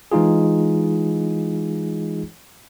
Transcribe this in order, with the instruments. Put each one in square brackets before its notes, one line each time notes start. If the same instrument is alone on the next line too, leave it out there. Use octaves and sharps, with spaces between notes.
[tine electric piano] E3 G#3 D#4 F4 G#4